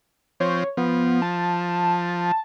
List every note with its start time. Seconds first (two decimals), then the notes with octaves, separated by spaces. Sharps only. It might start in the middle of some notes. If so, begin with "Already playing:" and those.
0.40 F3 C4 C#5
0.77 F3 B3
1.22 A5